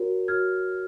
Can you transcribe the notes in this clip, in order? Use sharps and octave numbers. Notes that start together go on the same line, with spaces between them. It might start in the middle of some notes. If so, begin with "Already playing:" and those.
Already playing: F#4 A#4 C#5
F#4 A#4 C#5 F6 G#6